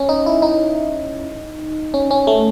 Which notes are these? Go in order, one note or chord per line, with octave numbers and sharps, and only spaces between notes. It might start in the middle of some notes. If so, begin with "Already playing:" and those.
Already playing: C#4
D#4
E4
D#4
C#4
C#4
A3